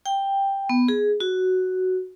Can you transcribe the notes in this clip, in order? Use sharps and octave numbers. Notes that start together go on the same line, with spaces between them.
G5
B3
G#4
F#4